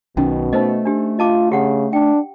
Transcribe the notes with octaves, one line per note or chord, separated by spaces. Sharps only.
B1 B2 D#3 C#4 D#4
A3 D#4 C5 D#5
D4 G4
F4 D#5 A5 D6
C#3 G4 F#5
D4 G5